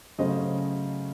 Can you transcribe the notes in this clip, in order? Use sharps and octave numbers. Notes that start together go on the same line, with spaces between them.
C#3 F#3 A3 C#4 C5 D#5